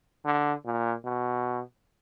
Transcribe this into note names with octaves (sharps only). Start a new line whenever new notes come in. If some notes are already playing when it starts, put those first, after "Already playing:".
D3
A#2
B2